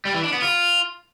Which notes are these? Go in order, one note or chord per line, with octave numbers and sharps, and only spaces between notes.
G3
E3
D4
B3
F4